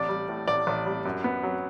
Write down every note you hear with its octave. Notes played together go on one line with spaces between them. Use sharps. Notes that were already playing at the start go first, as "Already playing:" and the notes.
Already playing: A1 D5
G3
A2
A1 D5
A1
G3
F#2
B3
F#3